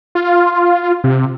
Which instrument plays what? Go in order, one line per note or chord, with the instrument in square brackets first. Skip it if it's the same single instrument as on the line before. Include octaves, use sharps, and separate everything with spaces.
[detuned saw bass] F4
C3